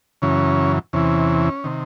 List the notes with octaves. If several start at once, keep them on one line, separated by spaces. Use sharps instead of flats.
F#2 C#3 E3 C#4
E2 C3 E3 C#4
C3 D#3